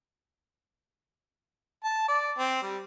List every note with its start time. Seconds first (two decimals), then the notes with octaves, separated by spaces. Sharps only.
1.84 A5
2.08 D5
2.38 C4
2.62 G3